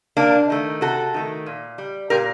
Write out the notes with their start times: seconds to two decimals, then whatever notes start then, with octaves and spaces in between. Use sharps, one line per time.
0.17 C3 A#3 D4
0.50 D#3 A3
0.81 C3 F#4 A4
1.14 D#3 A3
1.46 A#2
1.78 G3
2.10 A#2 G4 A#4